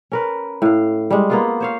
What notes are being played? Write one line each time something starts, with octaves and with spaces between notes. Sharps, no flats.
C#4 A#4 B4
A2 F5
G3 G#3
A#3 B3 F4
C5 C#5 F5